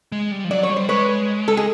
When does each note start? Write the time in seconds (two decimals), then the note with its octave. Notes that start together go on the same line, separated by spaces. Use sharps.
0.12 G#3
0.31 G3
0.44 F3
0.51 F#3 D5
0.63 C#5
0.70 G3
0.76 C5
0.89 G#3 B4 C#5
1.48 A4
1.57 G#4